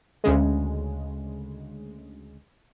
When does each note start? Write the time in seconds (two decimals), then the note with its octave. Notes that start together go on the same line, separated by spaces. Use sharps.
0.24 D2 C#3 G#3